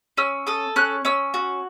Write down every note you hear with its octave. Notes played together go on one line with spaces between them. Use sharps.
C#4 E6
A4 D#6
C#4 F#6
C#4 E6
F#4